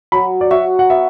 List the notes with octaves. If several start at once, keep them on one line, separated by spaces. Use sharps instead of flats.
F#3 B5
D5
F#4 E5
F#5
B3 E5